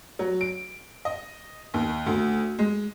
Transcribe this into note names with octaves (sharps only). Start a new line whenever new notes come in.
F#3
D7
D#5
D#2
D2
G#3